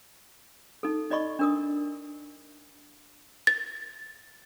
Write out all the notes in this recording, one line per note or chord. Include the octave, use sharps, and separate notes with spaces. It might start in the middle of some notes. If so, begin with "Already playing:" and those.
D#4 A4
D#4 D5 D#5 B5 C#6
D4 A#4 D#6
A6